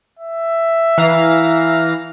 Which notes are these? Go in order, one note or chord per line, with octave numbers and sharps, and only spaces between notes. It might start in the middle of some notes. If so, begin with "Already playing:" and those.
E5
E3 F5 A#5